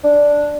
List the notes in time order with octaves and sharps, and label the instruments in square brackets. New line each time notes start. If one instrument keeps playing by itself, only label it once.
[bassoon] D4